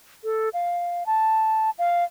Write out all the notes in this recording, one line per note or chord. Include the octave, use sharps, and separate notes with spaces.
A4
F5
A5
F5